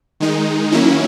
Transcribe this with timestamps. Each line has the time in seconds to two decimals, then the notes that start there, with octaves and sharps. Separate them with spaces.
0.20 D#3 G#3 D#4
0.72 D#3 F#3 A#3 C#4 E4